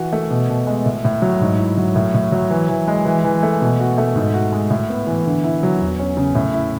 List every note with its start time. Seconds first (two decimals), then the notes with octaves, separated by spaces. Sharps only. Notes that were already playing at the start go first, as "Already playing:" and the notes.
Already playing: E3 F#4
0.13 A3
0.30 B2
0.49 B2
0.67 G#3
0.86 A2
1.05 A2
1.22 F#3
1.41 G#2
1.59 E4
1.77 F#3
1.96 A2
2.14 A2
2.32 F#3
2.50 E3
2.69 E3
2.88 G#3
3.05 E3
3.24 E3
3.43 A3
3.61 B2
3.79 F#4
3.98 A3
4.16 G#2
4.34 F#4
4.52 G#3
4.70 A2
4.89 B3
5.07 E3
5.26 D3
5.44 E4
5.63 F#3
5.81 E2
5.99 C#4
6.17 C#3
6.35 A2
6.53 E4